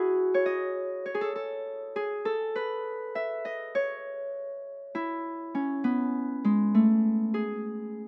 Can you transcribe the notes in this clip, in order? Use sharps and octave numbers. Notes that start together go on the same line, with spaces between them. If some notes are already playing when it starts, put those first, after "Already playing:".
Already playing: E4 F#4 G#4
C#5
D#5
C#5
G#4
A4
A4
G#4
A4
B4
E5
D#5
C#5
E4
C#4
B3
G#3
A3
G#4